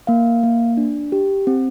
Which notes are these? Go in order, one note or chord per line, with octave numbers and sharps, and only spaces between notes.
A#3 F5
A#3
D4
G4
C4